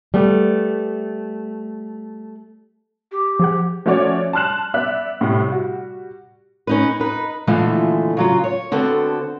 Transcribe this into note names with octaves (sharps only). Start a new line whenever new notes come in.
G3 A3 B3
G4
F3 G#4 F#5
F3 A3 C#4 F#4 C#5 D5
A5 C6 F6 F#6 E7
B3 D5 E5 F#6
A2 C3 G3
G3 F#4
C#4 D#4 B4
D#4 B4
A#2 D3 E3 F3 G#3 A3
C#3 F#3 F4
C#5
D3 B3 C4 F#4 A4